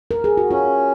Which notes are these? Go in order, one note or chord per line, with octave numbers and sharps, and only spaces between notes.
A#4
G#4
F#4
C#4 F4